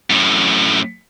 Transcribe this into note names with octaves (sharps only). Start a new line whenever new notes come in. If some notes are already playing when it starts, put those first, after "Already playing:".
F#2 A2